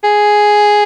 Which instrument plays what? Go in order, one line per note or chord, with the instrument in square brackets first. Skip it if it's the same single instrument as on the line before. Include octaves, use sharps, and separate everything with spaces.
[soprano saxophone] G#4